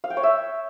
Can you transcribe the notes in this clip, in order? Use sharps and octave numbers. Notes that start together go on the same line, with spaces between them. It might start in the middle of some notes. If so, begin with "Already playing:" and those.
F5
G5
C#5
E5